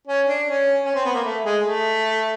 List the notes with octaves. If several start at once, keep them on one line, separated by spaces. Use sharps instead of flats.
C#4
D4
C#4
C#4
C4
B3
A#3
A3
G#3
A3